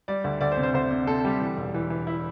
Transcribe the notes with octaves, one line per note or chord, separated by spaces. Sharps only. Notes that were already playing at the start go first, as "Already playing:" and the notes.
G3 D5
D2
D2 D5
C5
C3
C5
D2 C5
C3
C3 A4
G3 G4
E3
E1
E3
E3
E4